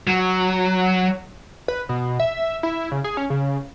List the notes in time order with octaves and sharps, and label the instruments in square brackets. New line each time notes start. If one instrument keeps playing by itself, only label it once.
[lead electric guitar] F#3
[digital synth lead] B4
B2
E5
E4
C#3
G#4
C#4
C#3